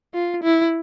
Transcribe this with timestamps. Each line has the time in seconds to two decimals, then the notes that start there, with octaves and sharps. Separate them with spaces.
0.14 F4
0.44 E4